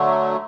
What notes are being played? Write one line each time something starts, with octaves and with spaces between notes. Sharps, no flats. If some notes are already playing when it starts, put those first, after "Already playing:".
Already playing: D3 F#3 A3